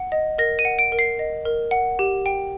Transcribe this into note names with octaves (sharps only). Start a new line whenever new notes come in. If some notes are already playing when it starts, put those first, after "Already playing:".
Already playing: F#5
D#5
A#4 A#6
D#7
F#5
D7
A#4
C7
D#5
A#4
F#5
G4
G5